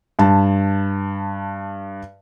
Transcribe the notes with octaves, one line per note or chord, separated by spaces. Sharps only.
G2 A5